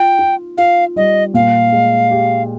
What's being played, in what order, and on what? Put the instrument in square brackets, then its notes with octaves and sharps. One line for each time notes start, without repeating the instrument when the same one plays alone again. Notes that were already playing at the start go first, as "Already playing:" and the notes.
Already playing: [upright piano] F4 [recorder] G5
[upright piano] F4
[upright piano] F4 [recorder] F5
[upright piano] G3 [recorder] D#5
[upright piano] A#2 [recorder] F5
[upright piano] G#3
G4